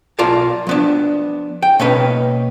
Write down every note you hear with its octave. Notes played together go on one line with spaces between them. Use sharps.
B1 F4 A#4 D5 A5
F3 B3 D4
G5
B2 A#3 C#4 D#4 B4